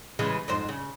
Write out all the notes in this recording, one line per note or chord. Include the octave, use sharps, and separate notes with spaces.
C#3 E3 G#3
F2 G#2 C5
C#3